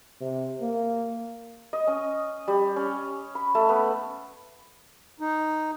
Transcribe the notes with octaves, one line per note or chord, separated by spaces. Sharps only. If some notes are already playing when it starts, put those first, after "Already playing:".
C3
A#3
D#5
C#4
G3
C#4
B5
A3
B3
D#4